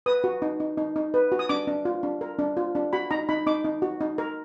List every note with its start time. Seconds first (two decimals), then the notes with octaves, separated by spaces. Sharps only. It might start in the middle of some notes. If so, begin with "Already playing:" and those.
0.06 B4 D#6
0.24 F#4
0.42 D#4
0.60 D#4
0.78 D#4
0.96 D#4
1.14 B4
1.32 F#4
1.39 D#6
1.49 D4 D6
1.68 D4
1.85 F4
2.03 D4
2.21 A#4
2.39 D4
2.57 F4
2.75 D4
2.93 F#4 B5
3.11 D#4 A#5
3.29 D#4 B5
3.47 D#4 D6
3.65 D#4
3.82 F#4
4.01 D#4
4.18 A#4